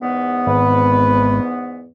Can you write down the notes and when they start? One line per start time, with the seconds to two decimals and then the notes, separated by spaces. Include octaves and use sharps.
0.01 E2 G#2 B3
0.47 G#1 B4